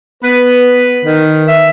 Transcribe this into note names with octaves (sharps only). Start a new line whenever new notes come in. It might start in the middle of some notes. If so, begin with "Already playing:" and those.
B3 B4
D#3
E5